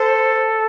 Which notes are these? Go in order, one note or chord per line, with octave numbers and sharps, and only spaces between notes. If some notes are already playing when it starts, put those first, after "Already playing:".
Already playing: A4 C5